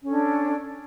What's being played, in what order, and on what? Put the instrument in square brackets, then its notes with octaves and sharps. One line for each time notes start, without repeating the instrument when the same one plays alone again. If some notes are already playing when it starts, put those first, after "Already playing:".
[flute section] C#4
A4
D4